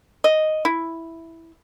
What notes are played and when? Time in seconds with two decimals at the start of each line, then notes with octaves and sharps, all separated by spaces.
0.24 D#5
0.65 E4